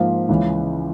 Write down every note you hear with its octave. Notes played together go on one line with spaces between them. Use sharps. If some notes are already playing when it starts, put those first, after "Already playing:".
Already playing: G#2 F3 A#3 F4
C#2 C#3 E3